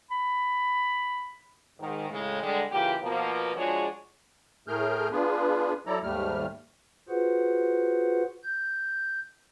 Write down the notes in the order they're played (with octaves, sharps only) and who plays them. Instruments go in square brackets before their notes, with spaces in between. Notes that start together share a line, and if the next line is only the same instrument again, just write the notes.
[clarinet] B5
[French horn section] G#2 D#3
A2 C#3 G#3
D3 G3 G#3
C#3 E3 A#3 F4 G4
B2 F3 A#3
F3 G#3 D4 F#4 G#4 C#5
[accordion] A2 A3 G#4 A#4 F6 G6
B3 D4 F4 G#4 B4
F#3 E4 A4 D5 A#5
D#2 G#2 G3 A3 F6
[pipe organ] F4 F#4 G#4 B4 C5 F#5
G6